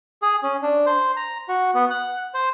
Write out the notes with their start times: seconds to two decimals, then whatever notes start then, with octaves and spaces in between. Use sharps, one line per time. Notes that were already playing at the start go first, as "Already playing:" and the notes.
0.22 G#4
0.43 C#4
0.62 D4
0.86 C5
1.16 A#5
1.48 F#4
1.75 B3
1.90 F#5
2.34 C5